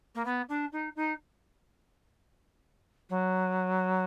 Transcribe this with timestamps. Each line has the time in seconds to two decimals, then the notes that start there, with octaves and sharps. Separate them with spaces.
0.15 A#3
0.25 B3
0.49 D4
0.72 D#4
0.96 D#4
3.09 F#3